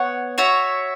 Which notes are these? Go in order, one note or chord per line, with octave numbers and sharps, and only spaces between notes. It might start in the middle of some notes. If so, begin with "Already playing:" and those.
Already playing: B3 C#5 F#5
F#4 C#5 E5